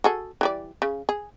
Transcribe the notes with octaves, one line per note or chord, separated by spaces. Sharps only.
F#4 G#4 A4
E3 G3 D5
C#3
G#4